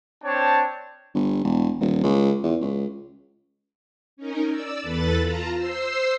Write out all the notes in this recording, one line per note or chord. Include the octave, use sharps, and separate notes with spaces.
C4 D4 C#5 A5
G1
E1
D#1
C#2
E2
C#2
C#4 D#4 A#4
D5 E6
E2 A4 B4 B5 A6
F4 A5 A#5
C5 C6 E6